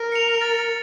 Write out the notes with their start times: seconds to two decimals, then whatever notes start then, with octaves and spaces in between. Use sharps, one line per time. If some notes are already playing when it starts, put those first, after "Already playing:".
Already playing: A#4
0.12 C#7 F7
0.41 A6